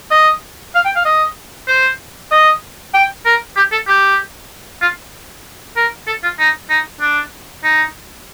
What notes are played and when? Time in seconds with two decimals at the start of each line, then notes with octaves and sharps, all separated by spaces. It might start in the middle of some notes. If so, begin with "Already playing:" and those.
0.11 D#5
0.75 F5
0.85 G5
0.96 F5
1.05 D#5
1.68 C5
2.31 D#5
2.94 G5
3.25 A#4
3.56 G4
3.72 A4
3.87 G4
4.82 F4
5.76 A#4
6.07 A4
6.23 F4
6.39 D#4
6.69 D#4
7.01 D4
7.64 D#4